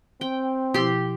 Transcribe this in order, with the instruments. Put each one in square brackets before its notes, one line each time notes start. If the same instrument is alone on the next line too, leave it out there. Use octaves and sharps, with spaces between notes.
[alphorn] C4 [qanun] G5
[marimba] B2 F3 E4 [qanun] G4 C6